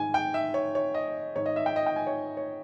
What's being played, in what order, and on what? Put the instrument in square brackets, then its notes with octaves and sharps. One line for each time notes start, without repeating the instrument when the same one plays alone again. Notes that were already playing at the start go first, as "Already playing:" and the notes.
Already playing: [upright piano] G#2 D#3 G#5
G5
E5
C#5
C#5
D#5
G#2 D#3 C#5
D#5
E5
G5
D#5
G5
G#5
C#5
C#5